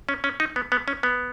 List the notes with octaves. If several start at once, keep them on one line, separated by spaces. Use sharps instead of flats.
C#4
C#4
D#4
B3
B3
C#4
B3